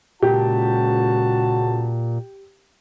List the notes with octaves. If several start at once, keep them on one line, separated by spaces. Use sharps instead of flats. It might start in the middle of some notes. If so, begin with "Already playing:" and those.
C#2 A#2 F#4 G4 A5